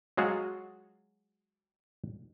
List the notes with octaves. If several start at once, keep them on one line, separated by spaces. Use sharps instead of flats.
F#3 G#3 F4 F#4 G#4